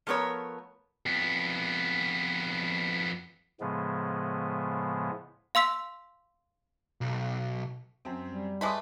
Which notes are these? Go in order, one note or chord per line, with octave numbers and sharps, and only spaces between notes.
F3 A3 B3 A#4 C#5
F2 B3
A2 C#3 F3 G#3 B3
F5 C6 E6 B6
B1
F#2 C4
G3
G#3 A3 B4 C6 D6 D#6